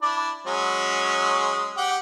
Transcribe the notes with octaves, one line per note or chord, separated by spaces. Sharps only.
D4 E4 D5
F#3 G#3 C#4
G4 F#5 G5